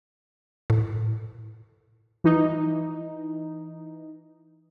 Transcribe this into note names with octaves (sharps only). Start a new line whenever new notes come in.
A2
E3 D#4